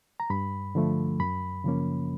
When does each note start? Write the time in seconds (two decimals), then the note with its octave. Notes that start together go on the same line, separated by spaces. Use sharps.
0.20 A#5
0.30 G2 B5
0.75 D3 F3 A3
1.20 F#2 B5
1.64 C#3 F3 A#3 C#4